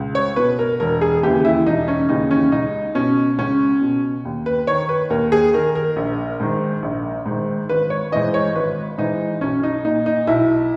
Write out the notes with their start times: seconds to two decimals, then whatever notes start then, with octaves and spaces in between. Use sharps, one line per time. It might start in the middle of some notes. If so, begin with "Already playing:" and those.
Already playing: C#2
0.15 C#5
0.36 B2 B4
0.59 A#4
0.80 E1 A#4
1.01 G#4
1.23 D#2 C#3 E3 G4
1.45 E4
1.66 E1 D#4
1.88 C#4
2.09 D#2 C#3 E3 D#4
2.31 C#4
2.52 C#2 D#4
2.95 B2 C#4
3.38 C#2 C#4
3.81 B2
4.25 D#2
4.46 B4
4.67 D#3 C#5
4.89 B4
5.10 D#2 A#4
5.32 G#4
5.53 D#3 A#4
5.75 A#4
5.96 A#1
6.40 G#2 D#3
6.82 A#1
7.26 G#2 D#3
7.69 G#1 B4
7.90 C#5
8.12 G#2 E3 D#5
8.34 C#5
8.55 G#1 B4
8.98 G#2 E3 D#4
9.41 B1 C#4
9.63 D#4
9.85 A#2 D#4
10.06 D#4
10.27 B1 E4